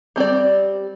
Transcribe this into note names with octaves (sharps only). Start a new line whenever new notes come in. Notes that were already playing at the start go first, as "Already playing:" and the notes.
G3 C4 G4 D5